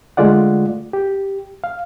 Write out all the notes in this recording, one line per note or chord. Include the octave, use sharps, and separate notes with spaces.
D3 G#3 A3 F4 D5 F#5
G4
F5